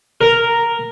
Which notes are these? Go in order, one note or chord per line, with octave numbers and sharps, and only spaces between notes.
A#4